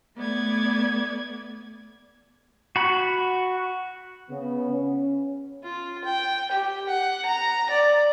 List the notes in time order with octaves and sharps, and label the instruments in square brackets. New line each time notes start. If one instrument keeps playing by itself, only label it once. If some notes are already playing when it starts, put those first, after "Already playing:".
[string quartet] A3 B3 D5 G#6
[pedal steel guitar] F#4 B5
[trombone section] C#3 B3
C#4
[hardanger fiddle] F4
G5
G4
F#5
A#5
D5